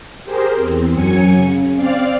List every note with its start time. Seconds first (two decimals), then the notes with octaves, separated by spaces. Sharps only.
0.24 G4 G#4 A#4 C5
0.54 E2 C4
0.92 F#2 F#3 G#5 C#7
1.34 C#3
1.75 C4 D5 F5